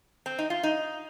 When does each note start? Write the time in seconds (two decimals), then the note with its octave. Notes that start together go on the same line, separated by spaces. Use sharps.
0.26 C4
0.39 D#4
0.50 F4
0.63 D#4